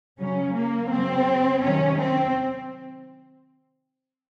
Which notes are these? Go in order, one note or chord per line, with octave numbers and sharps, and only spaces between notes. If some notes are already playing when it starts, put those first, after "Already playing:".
C#3 F#3 C#4
A#3
C#3 F#3 C4
C3 D#3 F#3 C#4
C4